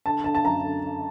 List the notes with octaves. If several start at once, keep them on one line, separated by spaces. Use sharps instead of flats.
D3 A5
D3 A5
A5
F#2 A#5
D3
D3